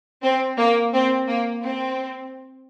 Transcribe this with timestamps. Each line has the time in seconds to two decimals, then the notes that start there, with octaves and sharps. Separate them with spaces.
0.23 C4
0.58 A#3
0.93 C4
1.27 A#3
1.63 C4